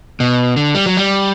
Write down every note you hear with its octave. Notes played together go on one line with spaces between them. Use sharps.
B2
D3
G3
F#3
G3